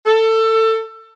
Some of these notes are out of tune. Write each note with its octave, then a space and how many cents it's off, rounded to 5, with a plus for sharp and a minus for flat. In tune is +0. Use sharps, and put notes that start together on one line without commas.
A4 +20